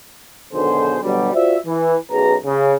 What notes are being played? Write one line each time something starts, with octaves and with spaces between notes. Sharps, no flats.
B1 B2 D3 D#3 G#4 C5
B2 D3 F#3 G3
F4 F#4 C5 D5 E5
E3
B1 F#2 G#4 B4 A#5
C#3